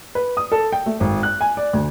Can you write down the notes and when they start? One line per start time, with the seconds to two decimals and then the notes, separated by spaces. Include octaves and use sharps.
0.15 B4
0.37 D#6
0.52 A4
0.72 G5
0.86 A3
1.00 G#1
1.23 F#6
1.41 G#5
1.57 D5
1.73 D2